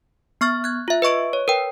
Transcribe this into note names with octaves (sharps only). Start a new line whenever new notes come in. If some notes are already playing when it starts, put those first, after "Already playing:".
B3 C#6 F6 A6
F#6 G#6
F4 E5
B4 D#5 C#6 D7
C#5
A#4 B4 G5